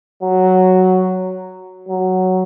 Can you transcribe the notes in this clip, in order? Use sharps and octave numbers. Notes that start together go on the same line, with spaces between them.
F#3
F#3